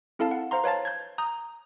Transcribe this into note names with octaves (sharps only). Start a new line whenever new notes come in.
C4 E4 A4 F5 A5
F#5
C5 F5 A#5 C6
B4 C#5 F5 A5 A6
G6 G#6
A#5 D#6 G6